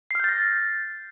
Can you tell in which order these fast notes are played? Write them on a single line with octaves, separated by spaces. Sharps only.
C7 F6 G6 A6 A#6